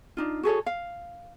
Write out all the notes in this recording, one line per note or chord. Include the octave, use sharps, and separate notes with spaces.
D4 D#4 F4
F#4 G#4 A4 C#5
F5